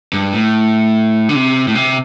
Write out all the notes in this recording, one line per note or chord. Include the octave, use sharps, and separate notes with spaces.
G2
A2
D3
C3
A2
C3